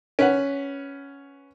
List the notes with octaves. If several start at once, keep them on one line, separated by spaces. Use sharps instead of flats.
C#4 B4 F#5